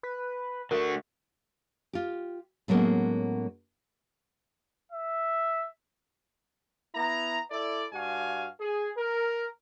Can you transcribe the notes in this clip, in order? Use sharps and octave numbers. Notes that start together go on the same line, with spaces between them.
B4
D3 A3 F#4 A#4
F4 G4
A2 F#3 G#3 A#3 B3 C#4
E5
B3 E4 A#5
E4 A4 D5
G2 F#4 F5 G#5
G#4
A#4